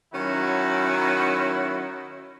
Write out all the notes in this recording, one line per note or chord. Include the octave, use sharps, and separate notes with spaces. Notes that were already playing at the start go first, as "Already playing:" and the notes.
D#3 F#3 C#4 E4 F#4